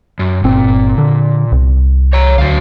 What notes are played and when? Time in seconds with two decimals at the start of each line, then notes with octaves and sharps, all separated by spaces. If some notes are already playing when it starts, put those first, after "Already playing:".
0.19 F#2
0.44 G1 A#2 C4
0.98 D3
1.52 C2
2.13 C#5 A#5
2.38 D2 F#3 F5